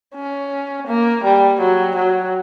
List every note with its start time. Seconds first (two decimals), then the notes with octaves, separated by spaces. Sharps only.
0.15 C#4
0.87 A#3
1.23 G3
1.59 F#3
1.96 F#3